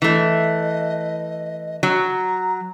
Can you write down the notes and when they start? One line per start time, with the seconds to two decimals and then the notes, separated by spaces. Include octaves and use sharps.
0.02 E3 A3 D#5
1.83 F#3 A#5